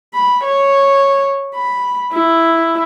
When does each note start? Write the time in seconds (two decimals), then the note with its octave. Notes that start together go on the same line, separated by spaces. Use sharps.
0.14 B5
0.44 C#5
1.55 B5
2.14 E4